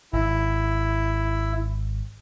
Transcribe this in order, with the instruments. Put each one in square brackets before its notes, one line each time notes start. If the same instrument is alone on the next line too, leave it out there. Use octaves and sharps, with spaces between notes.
[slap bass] G#1 [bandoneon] E4